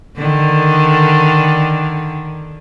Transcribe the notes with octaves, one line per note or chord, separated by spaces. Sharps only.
D3 D#3